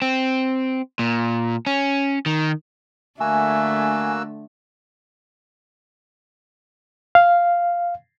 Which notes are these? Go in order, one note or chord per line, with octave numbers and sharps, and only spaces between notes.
C4
A#2
C#4
D#3
D3 A3 A#3 F#4 E5 G#5 E6
F5